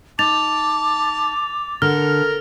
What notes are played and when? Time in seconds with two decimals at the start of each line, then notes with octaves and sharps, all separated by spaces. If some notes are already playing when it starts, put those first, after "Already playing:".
0.19 D#4 A5 D6 A6 F7
1.82 D3 A#4 F6